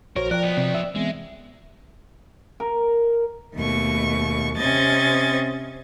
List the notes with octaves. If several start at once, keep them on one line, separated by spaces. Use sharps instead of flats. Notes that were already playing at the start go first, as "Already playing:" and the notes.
A#1 F#4 A#4 C5 C#5
F3 A#4 D5 G5 F#6
B3 D#4
C3
E5
E3 G#3 B3 C4
A#4
D#2 B2 A3 C#6
C3 C4 C#4 D#5 G#6 A6